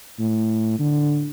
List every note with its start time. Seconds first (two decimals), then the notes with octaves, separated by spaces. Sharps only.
0.19 A2
0.79 D3